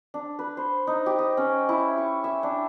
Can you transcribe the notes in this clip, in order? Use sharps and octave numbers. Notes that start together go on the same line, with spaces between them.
D4
B4
C5
D#4
G4
D#5
C#4
E4
C#6
E5
D4